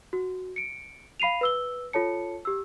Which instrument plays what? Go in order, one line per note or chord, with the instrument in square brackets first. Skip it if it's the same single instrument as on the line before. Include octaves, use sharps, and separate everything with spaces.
[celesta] F#4
C#7 D7
F5 B5 C7 D#7 F7
B4 E6 G7
F4 A4 C#5 A5 C#7
G4 E6